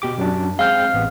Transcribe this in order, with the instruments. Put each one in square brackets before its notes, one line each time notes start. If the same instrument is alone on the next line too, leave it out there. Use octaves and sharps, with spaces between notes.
[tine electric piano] B2 G4 D6
F#2 F#3 D4
[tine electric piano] G#3 C4 G6 [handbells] F5 F6
[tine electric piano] A1 B3